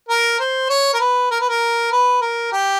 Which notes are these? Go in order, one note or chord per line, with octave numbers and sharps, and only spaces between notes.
A#4
C5
C#5
A#4
B4
A#4
B4
A#4
B4
A#4
G4